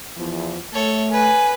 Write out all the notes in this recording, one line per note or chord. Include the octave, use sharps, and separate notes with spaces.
E2 F3
A3 A4 C#5
B4 G#5